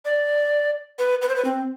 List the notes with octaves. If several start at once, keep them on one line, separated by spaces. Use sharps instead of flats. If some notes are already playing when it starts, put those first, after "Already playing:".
D5
B4
B4
C5
B4
C4